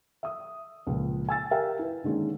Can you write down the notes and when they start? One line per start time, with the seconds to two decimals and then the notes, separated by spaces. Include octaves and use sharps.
0.23 E5 D#6
0.87 C#2 A#2 F3
1.29 G#5 E6 A6
1.51 G4 A#4 E5 F5 G5 G#5
1.79 E4 B4
2.04 D3 D#3 G#3 A#3 C#4